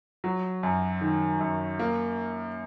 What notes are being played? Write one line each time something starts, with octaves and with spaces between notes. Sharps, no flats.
F#3
F#2
D#3
F#2
A#3